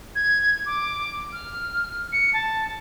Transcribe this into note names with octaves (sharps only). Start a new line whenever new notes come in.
G#6
D6
F6
C#7
A5